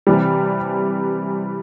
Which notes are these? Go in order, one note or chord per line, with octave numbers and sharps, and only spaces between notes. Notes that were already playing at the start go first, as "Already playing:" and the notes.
C3 E3 G3